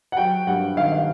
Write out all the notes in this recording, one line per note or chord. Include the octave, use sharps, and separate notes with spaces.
F#5
F#3 G5
G2 F#5
D#3 F5
F5